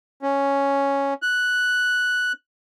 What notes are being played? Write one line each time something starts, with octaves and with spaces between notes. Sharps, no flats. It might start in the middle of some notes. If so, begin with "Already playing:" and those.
C#4
F#6